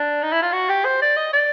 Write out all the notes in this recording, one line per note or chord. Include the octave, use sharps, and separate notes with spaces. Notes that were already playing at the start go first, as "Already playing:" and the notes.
Already playing: D4
D#4
E4
F4
F#4
G4
C5
D5
D#5
D5